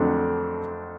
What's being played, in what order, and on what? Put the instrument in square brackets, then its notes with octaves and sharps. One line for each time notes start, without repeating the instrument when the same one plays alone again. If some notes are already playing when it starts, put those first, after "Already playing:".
Already playing: [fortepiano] F2 D3 F#3 A3 C4 D4